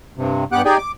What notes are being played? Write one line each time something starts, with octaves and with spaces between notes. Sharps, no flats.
G2 C3
G2 B3 G4 F#5 D6 F#6
D#4 G4 G#4 D5 G5 G#5
D6